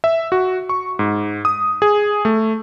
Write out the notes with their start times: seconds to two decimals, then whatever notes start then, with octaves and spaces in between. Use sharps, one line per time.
0.04 E5
0.32 F#4
0.69 C#6
0.99 G#2
1.45 D#6
1.82 G#4
2.25 A3